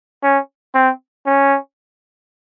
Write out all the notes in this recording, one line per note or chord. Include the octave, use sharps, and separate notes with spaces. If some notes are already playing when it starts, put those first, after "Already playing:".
C#4
C4
C#4